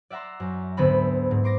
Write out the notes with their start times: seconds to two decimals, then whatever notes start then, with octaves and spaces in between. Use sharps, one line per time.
0.10 D5 E5 F#5 A#5 C6
0.40 F#2
0.77 D2 G#2 D3 B3 C4 B5
1.31 G#2
1.44 C6 D6 A#6